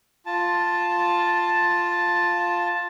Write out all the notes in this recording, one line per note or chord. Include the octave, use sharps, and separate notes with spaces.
F4 A5